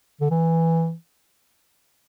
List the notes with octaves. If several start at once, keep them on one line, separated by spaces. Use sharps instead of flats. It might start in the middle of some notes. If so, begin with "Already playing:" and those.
D3
E3